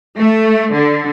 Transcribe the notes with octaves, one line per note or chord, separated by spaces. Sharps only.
A3
D3